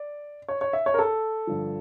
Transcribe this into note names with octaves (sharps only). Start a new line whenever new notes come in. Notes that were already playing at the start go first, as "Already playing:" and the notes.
Already playing: D5
C#5
C#5
E5
C#5
A#4
A4
G2 D3 F3